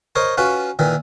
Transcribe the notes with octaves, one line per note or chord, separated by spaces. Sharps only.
A#4 C5 C#5 D#5
C#4 F4 F#4 B4
A#2 D#3 E3